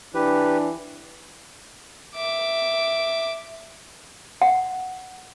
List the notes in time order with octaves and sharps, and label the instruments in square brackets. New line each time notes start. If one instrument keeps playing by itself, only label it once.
[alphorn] E3 [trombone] D4 [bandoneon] G4 B4
[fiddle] E5 D6
[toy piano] F#5